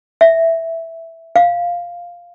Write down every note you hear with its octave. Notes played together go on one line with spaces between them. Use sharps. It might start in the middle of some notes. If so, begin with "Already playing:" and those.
E5
F5